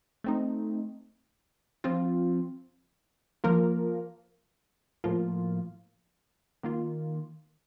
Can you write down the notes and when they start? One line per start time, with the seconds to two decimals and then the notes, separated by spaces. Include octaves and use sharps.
0.24 A3 C4 D#4
1.84 F3 C4 F4
3.44 F3 A#3 F4 A#4
5.04 A2 F3 A#3 F4
6.63 D#3 A#3 F4